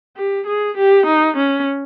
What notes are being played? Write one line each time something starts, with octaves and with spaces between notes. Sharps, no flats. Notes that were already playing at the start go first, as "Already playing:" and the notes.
G4
G#4
G4
D#4
C#4